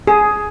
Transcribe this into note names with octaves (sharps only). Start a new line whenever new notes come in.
G#4